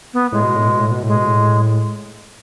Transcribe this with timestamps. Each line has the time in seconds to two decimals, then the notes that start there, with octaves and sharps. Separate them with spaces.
0.14 B3
0.32 A2 G#3
0.43 B2
0.56 A2
0.68 B2
0.79 A2
0.91 B2
1.03 A2 G#3
1.15 B2
1.26 A2